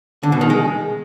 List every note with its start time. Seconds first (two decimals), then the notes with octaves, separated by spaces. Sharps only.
0.23 D3
0.32 B2
0.41 D#3
0.50 G#3